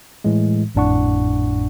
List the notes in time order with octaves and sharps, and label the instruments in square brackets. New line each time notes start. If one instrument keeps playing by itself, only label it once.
[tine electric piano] A2 E3 G#3
G#1 F2 A2 D4 F#5 C#6